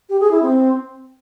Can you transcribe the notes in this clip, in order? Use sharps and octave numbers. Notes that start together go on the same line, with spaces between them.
G4
G#4
E4
C4